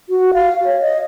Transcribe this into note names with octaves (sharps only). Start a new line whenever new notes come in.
F#4
F5
C#5
D#5